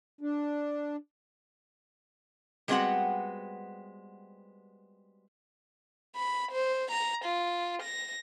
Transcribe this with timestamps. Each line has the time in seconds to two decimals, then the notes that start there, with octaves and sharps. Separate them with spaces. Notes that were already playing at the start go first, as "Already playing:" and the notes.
0.21 D4
2.68 G3 G#3 B3 C4 F#4 F#5
6.16 B5
6.52 C5
6.91 A#5
7.25 F4
7.82 A#6